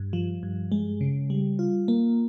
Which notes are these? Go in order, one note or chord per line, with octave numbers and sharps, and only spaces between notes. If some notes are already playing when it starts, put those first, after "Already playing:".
Already playing: G2
F3
G2
G#3
C#3
G3
F4
A#3